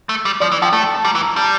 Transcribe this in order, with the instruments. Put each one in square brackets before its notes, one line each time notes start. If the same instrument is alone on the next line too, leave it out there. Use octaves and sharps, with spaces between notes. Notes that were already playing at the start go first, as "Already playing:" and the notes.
[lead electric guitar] A3
G3
[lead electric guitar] F3 [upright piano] D5
[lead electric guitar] E3
[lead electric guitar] F3 [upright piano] G5
[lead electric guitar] A3 [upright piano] A5
[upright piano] A5
A5
[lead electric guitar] G3 [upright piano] A#5
[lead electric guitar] E3
[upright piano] A#5
[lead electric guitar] G3 [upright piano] A5